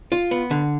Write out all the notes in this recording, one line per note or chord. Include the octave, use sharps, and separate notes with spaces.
F4
B3
D3